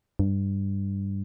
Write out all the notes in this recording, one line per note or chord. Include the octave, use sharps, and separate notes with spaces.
G2